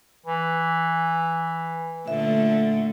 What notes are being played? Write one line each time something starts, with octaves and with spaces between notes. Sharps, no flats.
E3
A#2 D3 A3 E5